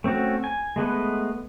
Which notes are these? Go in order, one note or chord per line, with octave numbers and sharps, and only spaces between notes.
A3 C4 C#4 F#4
G#5
G#3 A3 B3 B4